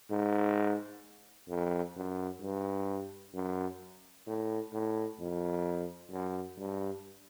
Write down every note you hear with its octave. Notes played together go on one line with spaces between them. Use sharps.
G#2
F2
F#2
G2
F#2
A2
A2
F2
F#2
G2